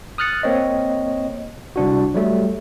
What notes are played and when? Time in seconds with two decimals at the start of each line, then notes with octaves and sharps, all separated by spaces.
0.18 D#6 F6 F#6 A6 C#7
0.43 A#3 C4 C#5 D#5
1.76 C2 D4 F#4
2.14 F#3 G3 A3